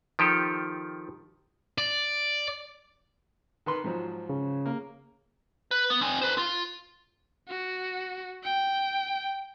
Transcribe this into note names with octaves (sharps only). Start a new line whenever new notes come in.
D#3 F3 G4 A4
D5
D#3 B4 C6
G#2 F3 F#3
C#3
A#3
B4
B3
C4 G#5
B4 C5
F4
F#4
G5